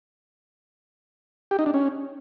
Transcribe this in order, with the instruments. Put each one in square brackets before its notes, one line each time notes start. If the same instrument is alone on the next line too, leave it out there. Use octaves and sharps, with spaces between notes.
[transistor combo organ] G4
D#4
D4
C#4